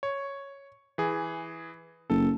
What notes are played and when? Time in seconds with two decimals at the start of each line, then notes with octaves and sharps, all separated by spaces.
0.03 C#5
0.98 E3 G#4
2.10 F#1 A4